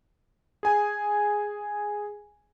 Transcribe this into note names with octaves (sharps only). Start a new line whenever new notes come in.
G#4 G#5